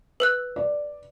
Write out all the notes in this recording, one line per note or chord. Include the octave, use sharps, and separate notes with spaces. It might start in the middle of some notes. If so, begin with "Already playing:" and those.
B4 E6 F#6
D5